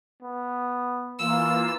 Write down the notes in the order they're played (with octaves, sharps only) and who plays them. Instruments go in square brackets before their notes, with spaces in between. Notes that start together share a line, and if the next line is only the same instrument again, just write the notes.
[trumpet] B3
[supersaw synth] E3 A#3 F4 [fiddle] E6